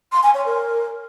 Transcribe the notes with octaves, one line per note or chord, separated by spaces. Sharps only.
C6
G#5
C#5
A#4